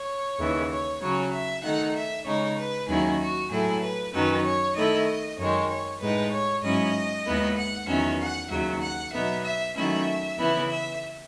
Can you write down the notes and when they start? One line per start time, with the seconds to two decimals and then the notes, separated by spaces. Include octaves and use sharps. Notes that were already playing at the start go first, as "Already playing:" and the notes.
Already playing: C#5
0.39 D#2 C#3 E3
0.70 C#5
1.01 C#3 F#3 C#4 C#5
1.32 E5
1.63 D#3 A3 D#4 F#5
1.94 E5
2.26 C#3 G#3 D#4 C#5
2.57 B4
2.88 D#2 D#3 F#3 C#4 E4 G#4
3.19 F#4
3.50 A2 F#3 A3 E4 G#4
3.82 B4
4.13 F#2 D#3 F#3 C#4 B4
4.44 C#5
4.75 D#3 A3 E4 D#5
5.38 F#2 D#3 G#3 C#5
5.69 C#5
6.00 A2 G#3 D#4 B4
6.32 C#5
6.63 G#2 F#3 C#4 E4 D#5
7.25 D#2 D#3 G#3 B3 E4
7.57 F#5
7.87 E2 D#3 F#3 C#4 E5
8.19 F#5
8.50 D#2 C#3 F#3 E5
8.81 F#5
9.13 B2 F#3 B3 D#4 E5
9.44 E5
9.75 D#3 F#3 A3 C#4 E4 E5
10.38 C#3 E3 B3 E4
10.69 E5